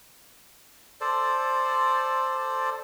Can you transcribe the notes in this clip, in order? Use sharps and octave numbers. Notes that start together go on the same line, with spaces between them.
A4 C5 D5